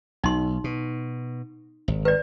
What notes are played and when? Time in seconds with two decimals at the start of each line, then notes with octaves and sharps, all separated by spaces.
0.24 B1 D#4 C6
0.64 B2
1.88 G#1
2.05 B4 D5